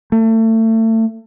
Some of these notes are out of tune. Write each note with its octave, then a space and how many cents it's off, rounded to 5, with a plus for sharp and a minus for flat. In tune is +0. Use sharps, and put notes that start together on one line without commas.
A3 +30